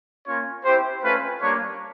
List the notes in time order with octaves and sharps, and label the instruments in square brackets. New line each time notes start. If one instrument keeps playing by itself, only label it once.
[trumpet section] A#3 C#4 F4 C#5
C4 E4 G4 C5
A3 C#4 F4 B4
G3 A#3 D4 C#5